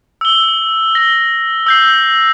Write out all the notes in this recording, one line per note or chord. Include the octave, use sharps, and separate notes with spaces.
E6 G7
A#6 G7
E6 G6 C7